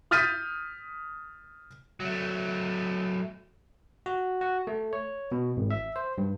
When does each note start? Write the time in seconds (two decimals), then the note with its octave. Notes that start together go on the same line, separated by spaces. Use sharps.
0.11 D#6 F6 G6 A6 B6 D#7
2.00 F#3 A3
4.06 F#4
4.41 F#4
4.67 A3
4.93 C#5
5.32 B2
5.57 G#1
5.71 E5
5.96 C5
6.18 G2